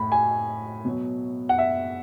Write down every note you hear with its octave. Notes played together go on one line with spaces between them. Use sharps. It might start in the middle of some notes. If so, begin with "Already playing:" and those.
Already playing: A2 B5
G#5
B2 F#3
F#5
E5